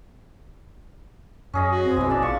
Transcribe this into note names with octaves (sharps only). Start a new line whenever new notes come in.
F#2 C#4 G#4 D#5
F#4
C4
A#1 B2 E3 G#3
C#4 D5 A5
F3 C#6